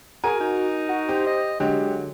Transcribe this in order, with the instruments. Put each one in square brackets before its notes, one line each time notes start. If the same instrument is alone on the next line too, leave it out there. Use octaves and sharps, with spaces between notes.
[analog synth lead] F#4 [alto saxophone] G#4 [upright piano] A#4 G#5
[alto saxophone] D#4
[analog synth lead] F#4
[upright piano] G4 [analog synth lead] C5
[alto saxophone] D#5
[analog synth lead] D3 [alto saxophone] F#3 [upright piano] G#3 G4